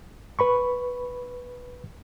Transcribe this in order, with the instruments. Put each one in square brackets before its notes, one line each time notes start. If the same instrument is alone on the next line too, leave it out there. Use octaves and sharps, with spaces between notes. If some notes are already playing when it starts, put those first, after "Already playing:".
[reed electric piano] B4 B5 C#6